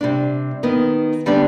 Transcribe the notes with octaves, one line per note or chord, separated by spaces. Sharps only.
C3 G3 D4
D#3 B3 D#4
D3 G3 B3 D4